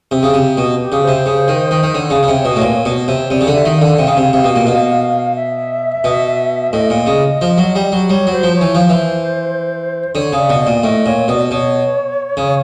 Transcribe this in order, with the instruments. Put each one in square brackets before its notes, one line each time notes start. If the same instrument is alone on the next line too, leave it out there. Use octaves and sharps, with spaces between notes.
[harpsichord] C3
C#3
C3
B2
[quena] G4
[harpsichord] C#3
[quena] C5
[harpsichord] C3
C#3
D#3
D#3
D#3
[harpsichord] D3 [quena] C#5
[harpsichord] C#3
C#3
C3
B2
A2
A#2
B2
C3
[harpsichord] C3 [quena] D5
[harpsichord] C#3
D3
[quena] E5
[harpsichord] D#3
[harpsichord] D3 [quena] F5
[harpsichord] C3 [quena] F5
[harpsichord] C#3
C3
C3
B2
A#2
B2
[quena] E5
[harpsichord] B2
[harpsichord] A2 [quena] D#5
[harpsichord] A#2
C#3
F3
F#3
G3
F#3
[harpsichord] G3 [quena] C#5
[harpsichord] F#3
[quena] C5
[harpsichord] F3
[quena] C#5
[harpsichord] E3
[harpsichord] F3 [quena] C5
[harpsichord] E3
[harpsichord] D3 [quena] C#5
[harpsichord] C#3
[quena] D5
[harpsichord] B2
[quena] D5
[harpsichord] A#2
[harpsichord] A2 [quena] D#5
[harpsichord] A#2 [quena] C#5
[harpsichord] B2 [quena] D5
[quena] D5
[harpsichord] B2 [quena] C#5
[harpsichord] C#3